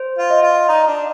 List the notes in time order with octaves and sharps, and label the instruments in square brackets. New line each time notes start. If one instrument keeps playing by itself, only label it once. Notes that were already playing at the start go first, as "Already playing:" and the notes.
Already playing: [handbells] C5
[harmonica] F4
[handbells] D#5
[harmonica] F4
[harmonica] D#4 [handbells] D5
[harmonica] D4